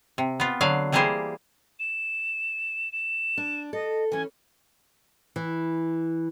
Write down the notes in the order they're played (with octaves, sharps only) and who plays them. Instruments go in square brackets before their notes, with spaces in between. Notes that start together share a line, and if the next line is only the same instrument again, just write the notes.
[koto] C3
B3 F4
D3 F#3 F5
E3 G3 A#3 G4 G#4 C5
[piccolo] E7
E7
[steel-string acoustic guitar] D4
[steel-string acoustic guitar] A4 [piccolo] D#5
[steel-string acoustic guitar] E3 C#4 [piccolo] G#5
[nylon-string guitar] E3